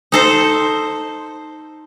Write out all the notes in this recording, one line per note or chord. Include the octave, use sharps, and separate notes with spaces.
D#4 A4 C5